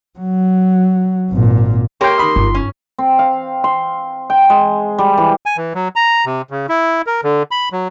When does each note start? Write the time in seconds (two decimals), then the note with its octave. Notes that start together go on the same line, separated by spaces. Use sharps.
0.19 F#3
1.31 G#1 A#2
2.01 A#3 G4 A#4 C#5 G5 C6
2.18 D#3 B5 D#6
2.36 G1
2.55 C#4
2.99 C4
3.19 F5
3.64 C6
4.30 G5
4.50 G#3
4.98 G3
5.17 E3
5.46 G#5
5.57 E3
5.74 F#3
5.96 A#5
6.26 C3
6.50 C#3
6.69 E4
7.07 A#4
7.24 D3
7.51 B5
7.72 F#3